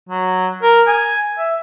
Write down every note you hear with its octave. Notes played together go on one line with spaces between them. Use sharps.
F#3
A#4
G#5
E5